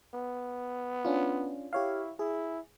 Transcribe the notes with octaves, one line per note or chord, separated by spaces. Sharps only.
B3
C#4 D4 F4
E4 G4 C#5 F5
E4 G#4